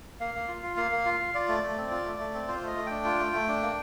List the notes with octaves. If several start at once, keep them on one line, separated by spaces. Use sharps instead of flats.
A#3 F5
A#3
F4
F4
A#3 F5
A#3
F4
F4
F4 D5
A3
A3
C4
F4
A3
A3
C4
F4 C5
A3 D#5
A3
D4 G5
F4
A3
A3
D4
A#3